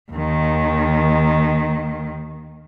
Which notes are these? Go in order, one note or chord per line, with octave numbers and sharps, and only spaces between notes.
D#2 D#3